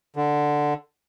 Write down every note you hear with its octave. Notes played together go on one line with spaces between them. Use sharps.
D3